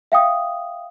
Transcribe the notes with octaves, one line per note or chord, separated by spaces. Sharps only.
E5 F5 G5 D#6